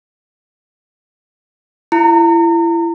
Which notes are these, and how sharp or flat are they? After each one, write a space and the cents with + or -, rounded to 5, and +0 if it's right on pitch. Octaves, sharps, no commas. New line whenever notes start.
E4 +30 A#5 -35